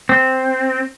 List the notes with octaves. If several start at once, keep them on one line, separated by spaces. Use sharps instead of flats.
C4